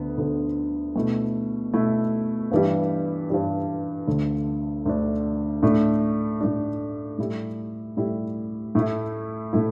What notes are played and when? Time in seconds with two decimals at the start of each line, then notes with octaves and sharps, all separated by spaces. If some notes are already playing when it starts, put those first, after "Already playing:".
Already playing: D2 D3 B3
0.18 D2 D3 B3
0.96 B2 A3 E4
1.74 B2 A3 E4
2.52 G2 E3 G3
3.30 G2 E3 G3
4.07 D2 D3 A3 D4
4.86 D2 D3 A3 D4
5.63 A2 A3 D4
6.41 A2 A3 D4
7.19 A2 G3 E4
7.97 A2 G3 E4
8.75 A2 A3 E4
9.53 A2 A3 E4